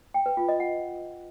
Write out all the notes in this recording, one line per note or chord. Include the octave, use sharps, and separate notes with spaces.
G5
B4
F4
D#5
F#5